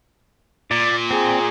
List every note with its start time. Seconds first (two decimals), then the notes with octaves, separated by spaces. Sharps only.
0.71 A#2 D5
1.11 C4 G#4